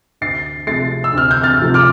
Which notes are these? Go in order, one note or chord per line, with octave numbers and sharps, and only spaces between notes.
D2 A6 C7
C3 F3 A3 A6 C7
E6
D2 F6
G6
F6 A6
C3 F3 A3
D6 F6